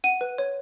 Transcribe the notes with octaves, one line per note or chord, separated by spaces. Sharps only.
F#5 D#7
B4
C#5